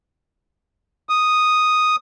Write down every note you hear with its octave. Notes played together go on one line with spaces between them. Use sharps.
D#6